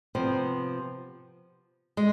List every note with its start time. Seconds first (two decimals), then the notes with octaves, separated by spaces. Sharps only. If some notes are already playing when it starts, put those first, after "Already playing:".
0.15 C3 F3 B3
1.97 G#3